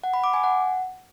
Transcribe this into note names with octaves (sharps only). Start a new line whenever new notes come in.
F#5
B5
D6
G#5
F#5